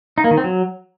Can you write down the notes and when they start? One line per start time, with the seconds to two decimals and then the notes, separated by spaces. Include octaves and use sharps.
0.18 D#4
0.24 A#3
0.31 D#3
0.37 C4
0.44 F#3